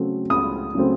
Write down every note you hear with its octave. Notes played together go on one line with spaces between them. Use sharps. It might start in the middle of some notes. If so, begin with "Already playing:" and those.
Already playing: C#3 F#3 A3 C4
C#2 D#6
C#3 F#3 A3 C4